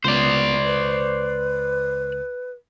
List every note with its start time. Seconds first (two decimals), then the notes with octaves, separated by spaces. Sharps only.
0.04 C#2 B3 C5 D5
0.64 B4